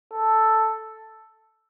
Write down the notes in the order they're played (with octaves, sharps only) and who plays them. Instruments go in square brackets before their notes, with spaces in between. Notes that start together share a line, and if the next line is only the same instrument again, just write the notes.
[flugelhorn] A4